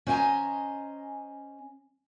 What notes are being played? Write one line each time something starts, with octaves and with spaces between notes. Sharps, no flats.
C#4 C5 D#5 G5 G#5 A#5